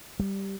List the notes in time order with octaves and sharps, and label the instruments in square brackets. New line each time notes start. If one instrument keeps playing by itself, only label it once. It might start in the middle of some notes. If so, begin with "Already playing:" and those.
[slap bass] G3